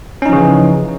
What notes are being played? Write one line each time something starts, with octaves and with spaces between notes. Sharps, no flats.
C#3 E3 F3 C#4 D#4